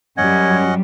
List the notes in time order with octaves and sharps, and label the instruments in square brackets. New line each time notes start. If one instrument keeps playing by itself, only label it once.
[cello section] F#2 G3 [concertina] C#4 D#5 F#5 [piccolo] G#6